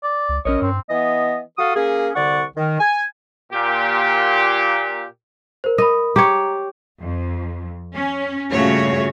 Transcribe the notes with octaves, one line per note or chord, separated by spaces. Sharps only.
D5
C#2
A#1 C#4 A#4 C#5 D#5
G2 C4
E3 B3 D#5
F#4 A4 F5 D#6
A#3 C#4 G#4
C2 D3 D5 F#5 C#6
D#3
G#5
A#2 G4
A#4 C5
A#4 D#5 B5
G4 C#5 A#5
F2
C#4
G2 A#2 C#3 A3 F#4 C#5